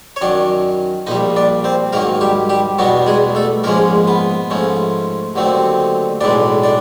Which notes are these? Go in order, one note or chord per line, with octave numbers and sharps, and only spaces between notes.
C#5
F#2 D#3 F#3 D4 D5
A#1 A#2 G3 D#4 D#5
D4 D5
C4 C5
G#2 D#3 F#3 A#3 A#4
G3 G4
G3 G4
E2 B2 F#3 G3 B3 D4 F#4
G#3 G#4
A3 A4
A#1 G#2 F3 G#3 A#3 C#4 A#4
B3 B4
G#2 F3 A3 C#4
D#2 D3 F#3 A3 C4
B1 A2 E3 G#3 D4 D5
D4 D5